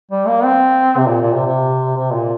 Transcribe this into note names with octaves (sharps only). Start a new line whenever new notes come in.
G3
A#3
C4
C3
A#2
A#2
C3
C3
C3
A#2